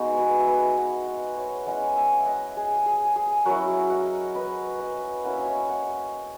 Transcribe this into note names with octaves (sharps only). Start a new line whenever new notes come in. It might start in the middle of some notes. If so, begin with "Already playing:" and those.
Already playing: G#3 B3 D#4 F#4
G#4 B4
E5
B4 D#5
D#5 F#5
D#5 F#5
C#5 E5
G#3 C#4 E4 D#5 F#5
E5 G#5
D#5 F#5
G#4
G#4
G#4
F#3 C#4 E4 F#4 A#4
D#5 F#5
B4 D#5
B4 D#5
A#3 C#4 E4 F#5
E5
D#5
C#5 E5
D#5 F#5